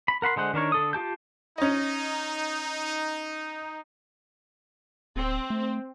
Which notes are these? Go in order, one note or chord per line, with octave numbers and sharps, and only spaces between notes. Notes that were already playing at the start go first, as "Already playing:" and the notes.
B5
A#4 F#5 B5 C6
D3 G#3 C5 F#5
D#3 D4 A#4 C#5
D3 A4 D#6
F4 G4 A5 G6
C#4 D#4 D#5
D1 C4
A3